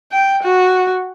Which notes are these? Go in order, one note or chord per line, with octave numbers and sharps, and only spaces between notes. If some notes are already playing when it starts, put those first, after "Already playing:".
G5
F#4